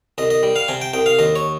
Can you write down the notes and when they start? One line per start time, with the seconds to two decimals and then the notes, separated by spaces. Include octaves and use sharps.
0.18 C2 D#5
0.30 D#5
0.43 G3
0.56 F5
0.68 C3 G#5
0.81 G5
0.93 C2 G5
1.06 F5
1.19 D#2 D#5
1.36 C#5